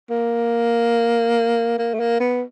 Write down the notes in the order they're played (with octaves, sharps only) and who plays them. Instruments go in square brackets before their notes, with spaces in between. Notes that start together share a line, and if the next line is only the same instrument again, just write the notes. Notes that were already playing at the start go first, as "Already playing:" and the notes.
[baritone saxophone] A#3
A#3
A3
A#3
B3